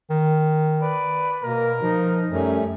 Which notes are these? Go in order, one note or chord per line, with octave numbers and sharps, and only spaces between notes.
D#3
B4 D5
B2 A#3 A#4
F3 D#4
F#2 G3 A3 C#4